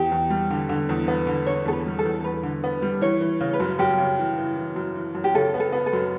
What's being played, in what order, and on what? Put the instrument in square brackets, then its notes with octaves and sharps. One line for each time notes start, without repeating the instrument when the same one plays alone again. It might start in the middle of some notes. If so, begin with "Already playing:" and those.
Already playing: [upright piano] E2 [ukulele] G4
[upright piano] E2
G3
D3
D3
E2
B3
D3
[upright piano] D3 [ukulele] C#5
[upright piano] E2 [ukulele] A4
[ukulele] B4
[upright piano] G3
[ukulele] A4
[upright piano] E2
[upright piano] E2 [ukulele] B4
[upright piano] D3
B3
G3
[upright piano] E3 [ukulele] C#5
[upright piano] E3
C#3
[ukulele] B4
[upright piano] F#2
[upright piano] F#2 [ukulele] G4
[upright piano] C#3
E3
E3
E3
F#2
E3
F#2
[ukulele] G4
[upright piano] C#3 [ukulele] A4
[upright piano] B3
[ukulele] A4
[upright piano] B3
[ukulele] A4
[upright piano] F#2